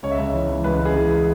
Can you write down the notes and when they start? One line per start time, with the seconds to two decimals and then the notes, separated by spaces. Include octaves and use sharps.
0.03 C#2 C#5
0.11 E5
0.18 C#2 C#5
0.33 E3
0.49 E3
0.64 C#2 B4
0.80 C#2
0.85 G#4
0.96 E3